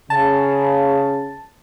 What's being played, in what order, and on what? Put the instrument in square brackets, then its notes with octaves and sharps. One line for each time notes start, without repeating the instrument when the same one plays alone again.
[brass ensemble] C#3 [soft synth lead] A5